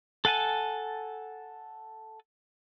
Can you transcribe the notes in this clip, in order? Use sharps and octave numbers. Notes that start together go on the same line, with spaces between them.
A4 F#5 G#5 A5